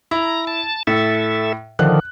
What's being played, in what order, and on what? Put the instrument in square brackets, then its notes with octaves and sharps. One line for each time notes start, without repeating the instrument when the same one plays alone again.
[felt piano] E4 [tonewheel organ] A#5
[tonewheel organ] A5
[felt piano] A2 [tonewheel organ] A4 E5
[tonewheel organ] D3 D#3 F3 [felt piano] F#6